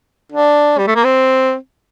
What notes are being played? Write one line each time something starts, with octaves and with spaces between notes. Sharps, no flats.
D4
G3
A3
A#3
C4